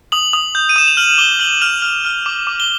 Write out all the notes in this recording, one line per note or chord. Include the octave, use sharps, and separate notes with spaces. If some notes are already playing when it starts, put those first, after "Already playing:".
D#6 F#7
D#6
G6
D#7
D#6 E7
F7
F6 F#7
D6 G7
F6 F#7
F6 F7
F6
F6
D6
D6
G7